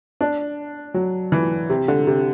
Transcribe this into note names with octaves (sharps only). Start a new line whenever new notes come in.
D4
F#3
E3
C3
D3
C3